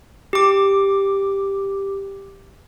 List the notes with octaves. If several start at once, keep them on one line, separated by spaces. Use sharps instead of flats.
G4 D6